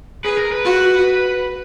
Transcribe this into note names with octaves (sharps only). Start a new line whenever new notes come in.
G#4 B4
A#4
B4
F#4